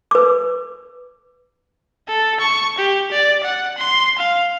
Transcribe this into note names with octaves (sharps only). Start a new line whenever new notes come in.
B4 D6
A4
C#6
G4
D5
F#5
C6
F5